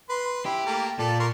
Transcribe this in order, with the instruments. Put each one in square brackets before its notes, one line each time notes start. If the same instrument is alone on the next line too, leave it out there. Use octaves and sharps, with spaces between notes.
[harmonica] B4 C6
[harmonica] E4 [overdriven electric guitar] G4
[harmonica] A3 A#3 A#4
[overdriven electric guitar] A#2 [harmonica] A4 D5
[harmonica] A#4 C6 C#6